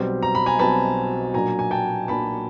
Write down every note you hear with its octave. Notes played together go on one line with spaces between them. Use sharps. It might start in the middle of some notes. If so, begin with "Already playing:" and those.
Already playing: B1 B2 G3 C4
A#5
B5
G#5 A#5
B1 B2 G3 C4 A5 B5
B1 A#2 F#3 A#3 D4 G#5 A#5
G#5
G5 A5
B1 A#2 F#3 A#3 D4 A5 B5